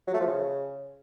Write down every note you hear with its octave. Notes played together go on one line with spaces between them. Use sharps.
F#3
A3
F3
C#3